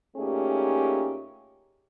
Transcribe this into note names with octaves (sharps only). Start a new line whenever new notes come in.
A#2 A3 C#4 D#4 G4 G#4